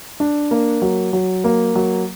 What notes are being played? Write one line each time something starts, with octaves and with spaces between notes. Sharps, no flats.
D4
A#3
F#3
F#3
A#3
F#3